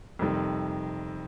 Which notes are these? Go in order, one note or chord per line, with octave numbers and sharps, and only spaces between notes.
F2 C3 D#3 G3